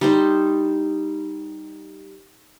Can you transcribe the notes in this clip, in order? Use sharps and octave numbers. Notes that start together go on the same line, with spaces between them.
G3 D#4 C5